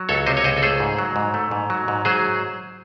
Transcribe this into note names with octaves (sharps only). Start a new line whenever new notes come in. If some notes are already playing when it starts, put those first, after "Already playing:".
Already playing: F#3
C#2 A4 C#5
C3 C5 D#5
C#5
C#2 C5 D#5
A4
A3 G#4 C5
G#2
F#3
G#2
A3
G#2
F#3
G#2
F#3 G#4 C5